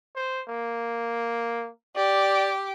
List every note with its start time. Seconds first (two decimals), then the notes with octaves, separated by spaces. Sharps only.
0.16 C5
0.48 A#3
1.96 G4 D5 D6